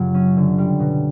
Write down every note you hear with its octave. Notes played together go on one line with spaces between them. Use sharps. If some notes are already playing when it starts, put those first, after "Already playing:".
Already playing: F#2 C#3 F#3 F4 G4
C#4
D3
G3
B2